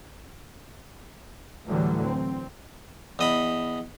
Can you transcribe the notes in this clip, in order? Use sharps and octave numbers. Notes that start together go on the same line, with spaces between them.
D2 A2 D3 E3 F#3 G3
C4
E2 D#5 B5